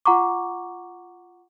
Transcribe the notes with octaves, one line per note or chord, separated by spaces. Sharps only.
F4 F#5 A#5 C#6 D6